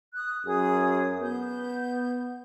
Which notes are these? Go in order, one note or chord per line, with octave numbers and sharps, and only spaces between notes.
D#6 F#6
F#2 G#4 D#6
B3 G6